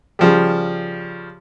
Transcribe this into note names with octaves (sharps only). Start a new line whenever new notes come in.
C#3 F3 G3